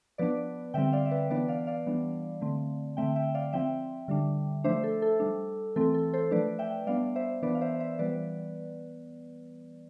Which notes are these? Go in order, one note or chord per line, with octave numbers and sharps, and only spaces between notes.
F3 B3 D4 B4 D5
D3 G3 C4 E5 G5
D5 F5
E5
B4 D5
E3 B3 D4 B4 D5
D5 F5
D5 F5
E3 G3 B3 D4
D3 A3 C4
D3 A3 C4 E5 G5
E5 G5
D5 F5
F3 C4 E5 G5
D3 G3 D4
F3 A3 D4 C5 E5
A4
A4
G3 D4
E3 A3 C4 A4
A4
A4 C5
F3 A3 D4 B4 D5
E5 G5
G3 B3 D4 D5 F5
C5 E5
E3 B3 D4 B4 D5
F5
C5 E5
C5 E5
E3 G3 B3 B4 D5